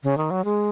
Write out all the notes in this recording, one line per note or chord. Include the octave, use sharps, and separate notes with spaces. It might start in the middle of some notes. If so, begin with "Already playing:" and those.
C#3
D#3
F#3
G#3